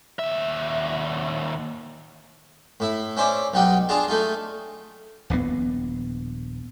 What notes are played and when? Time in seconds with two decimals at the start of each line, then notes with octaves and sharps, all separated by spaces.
0.19 D#2 E5
2.80 A2 E4
3.17 C#4 E4 C5 D5
3.54 B1 G3 D#4 F#5 G5
3.89 D4 F4 G#4 A5 A#5
4.08 A3 D#4 F4
5.30 D#1 A#1 A2 B3